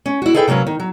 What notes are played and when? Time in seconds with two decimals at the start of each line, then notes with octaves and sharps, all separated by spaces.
0.06 C#4
0.22 E4 F#4
0.34 G#4 A4 B4 E5 G5
0.48 C3 F#3 A#3 C#4 B4
0.67 D#3
0.80 F#3